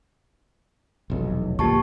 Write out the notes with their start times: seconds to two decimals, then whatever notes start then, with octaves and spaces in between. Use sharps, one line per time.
1.10 F1 B1 E2
1.59 C#2 A#2 F3 G4 A5 C#6